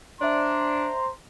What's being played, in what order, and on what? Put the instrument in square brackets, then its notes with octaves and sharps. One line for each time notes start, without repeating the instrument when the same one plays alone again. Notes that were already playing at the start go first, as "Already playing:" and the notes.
[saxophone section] D4 [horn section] C5 A#5 C6 [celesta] D5 E5